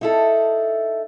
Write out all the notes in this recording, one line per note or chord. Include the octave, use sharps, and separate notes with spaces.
D#4 E4 A4